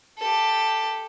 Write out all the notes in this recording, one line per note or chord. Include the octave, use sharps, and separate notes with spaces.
G4 A4